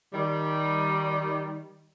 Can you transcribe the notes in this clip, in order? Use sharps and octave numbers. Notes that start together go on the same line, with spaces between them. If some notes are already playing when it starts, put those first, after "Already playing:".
D#3 G3